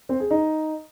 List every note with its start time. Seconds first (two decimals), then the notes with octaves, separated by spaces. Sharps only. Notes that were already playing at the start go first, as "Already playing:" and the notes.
0.09 C4
0.20 G#4
0.31 D#4